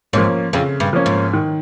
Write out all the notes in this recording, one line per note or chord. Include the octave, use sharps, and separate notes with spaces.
G#2 F3 A#3 C#4
F2 C#3
G2
F3 A#3 C#4
G#2
D#3